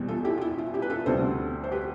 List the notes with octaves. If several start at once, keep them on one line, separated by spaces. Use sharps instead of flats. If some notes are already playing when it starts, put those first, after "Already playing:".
Already playing: E2 B2 G3 C4
F4 A4
E4 G4
F4
E4
F4
E4 G4
B4
F4 A4
D2 C3 G3 C4 A4 C5
C5
G4 B4